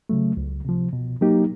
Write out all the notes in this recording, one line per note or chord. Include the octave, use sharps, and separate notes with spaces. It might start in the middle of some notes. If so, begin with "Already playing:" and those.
C#3 F#3 A3
C#2
C3 F3
B2
F#3 A#3 D#4 G4